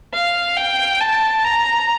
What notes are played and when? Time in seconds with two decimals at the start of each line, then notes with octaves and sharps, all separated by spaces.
0.13 F5
0.57 G5
1.01 A5
1.45 A#5